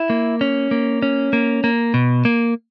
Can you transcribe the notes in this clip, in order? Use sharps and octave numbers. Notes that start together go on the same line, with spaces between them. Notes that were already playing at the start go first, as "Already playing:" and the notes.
Already playing: E4
A#3
C#4
A#3
C#4
A#3
A#3
B2
A#3